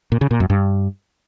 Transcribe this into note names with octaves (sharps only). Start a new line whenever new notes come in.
A#2
C#3
A#2
F#2
G2